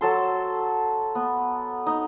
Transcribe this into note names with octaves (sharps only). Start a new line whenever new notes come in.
F#3 A4 C6
B3
D#4